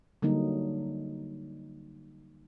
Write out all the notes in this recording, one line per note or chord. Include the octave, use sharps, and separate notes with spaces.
D3 F#3 G3 A#3 D#4